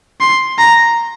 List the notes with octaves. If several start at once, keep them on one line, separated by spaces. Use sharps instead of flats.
C6
A#5